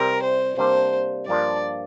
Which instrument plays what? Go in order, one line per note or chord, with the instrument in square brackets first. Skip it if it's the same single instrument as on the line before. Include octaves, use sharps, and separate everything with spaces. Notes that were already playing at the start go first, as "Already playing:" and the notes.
Already playing: [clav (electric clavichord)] C2 C3 G3 C4 [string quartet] A#4
[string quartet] C5
[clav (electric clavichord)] C3 G3 A#3 D4 [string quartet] C5
[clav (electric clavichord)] G2 F3 A#3 D4 F4 [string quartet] D5